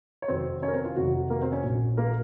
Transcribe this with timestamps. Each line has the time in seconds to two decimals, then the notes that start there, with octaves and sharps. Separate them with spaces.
0.22 C#5
0.28 F1 F2 D#3 F#3 C4 C5
0.62 C#4 C#5
0.68 A#4
0.73 C4 C5
0.85 F4
0.96 F1 F2 C3 D#3 F#3 F#4
1.30 A#3 A#4
1.42 C4 C5
1.52 C#4 C#5
1.63 A#1 A#2 F#3
1.97 A#3 A#4